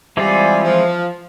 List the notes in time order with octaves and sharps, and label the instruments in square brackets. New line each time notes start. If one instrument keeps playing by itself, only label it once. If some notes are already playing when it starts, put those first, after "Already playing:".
[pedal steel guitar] E3 G#3 C4 F4 G#4 [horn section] G3
[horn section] F3